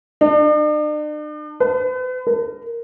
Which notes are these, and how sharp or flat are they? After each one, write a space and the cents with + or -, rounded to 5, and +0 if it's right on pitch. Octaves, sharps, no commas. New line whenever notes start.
D4 +45
B4 +40
A#4 -5